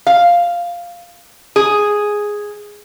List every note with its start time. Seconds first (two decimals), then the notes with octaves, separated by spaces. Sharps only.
0.07 F5
1.56 G#4